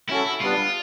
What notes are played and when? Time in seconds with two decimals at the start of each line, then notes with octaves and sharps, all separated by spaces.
0.10 C#4 E4 F#4 A4
0.41 G3 B3 D4 F4